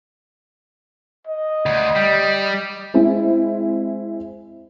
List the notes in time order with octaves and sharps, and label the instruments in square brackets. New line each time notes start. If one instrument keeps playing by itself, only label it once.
[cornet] D#5
[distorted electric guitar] D2
G3
[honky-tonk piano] G#3 C4 E4